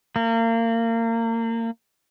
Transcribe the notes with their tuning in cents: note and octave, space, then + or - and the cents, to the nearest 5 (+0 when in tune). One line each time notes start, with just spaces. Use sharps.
A#3 -30